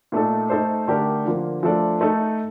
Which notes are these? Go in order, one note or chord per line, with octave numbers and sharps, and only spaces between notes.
A#2 A3 D#4 A4
A3 D#4 A4 C5
D3 A3 D4 G4 A#4
D3 F3 A#3
F3 A3 D4 A4 D5
A3 D#4 A4